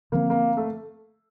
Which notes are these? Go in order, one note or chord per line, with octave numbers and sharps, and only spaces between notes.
D3 F3 A#3 C4
A#3
A3